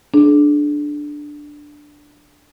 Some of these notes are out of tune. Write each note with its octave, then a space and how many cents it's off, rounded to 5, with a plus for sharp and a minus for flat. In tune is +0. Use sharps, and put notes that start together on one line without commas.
D4 +5 G#4 +45